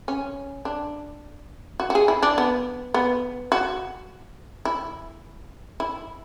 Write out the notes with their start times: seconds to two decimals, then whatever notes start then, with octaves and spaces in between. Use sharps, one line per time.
0.08 C#4
0.65 D4
1.80 F#4
1.90 F#4
1.95 G#4
2.08 E4
2.23 D4
2.38 B3
2.94 B3
3.52 F#4
4.65 E4
5.80 E4